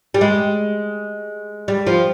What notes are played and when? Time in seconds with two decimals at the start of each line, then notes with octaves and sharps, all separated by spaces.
0.14 G3
0.21 G#3
1.68 G3
1.87 F3